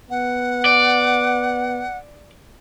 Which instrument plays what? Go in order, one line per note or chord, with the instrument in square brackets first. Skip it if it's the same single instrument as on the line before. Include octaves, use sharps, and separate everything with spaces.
[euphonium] B3 [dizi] F#5
[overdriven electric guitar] D5